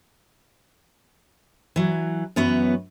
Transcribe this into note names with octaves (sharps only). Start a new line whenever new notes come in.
E3 F#3
F#2 E3 B3 F#4 B4 C#5